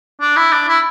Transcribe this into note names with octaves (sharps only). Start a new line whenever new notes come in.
D4
E4
D4
E4